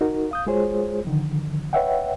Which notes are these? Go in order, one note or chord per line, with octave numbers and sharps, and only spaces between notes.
D#4 F#4 A#4
F5 D#6 G6
G#3 F4 F#4 G#4 C5 C#5
D3 D#3 F3
B4 C#5 D#5 E5 F#5 G5